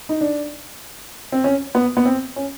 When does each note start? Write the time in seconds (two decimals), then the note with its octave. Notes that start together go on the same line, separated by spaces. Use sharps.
0.09 D#4
0.21 D4
1.32 C4
1.44 C#4
1.75 B3
1.97 B3
2.05 C4
2.36 C#4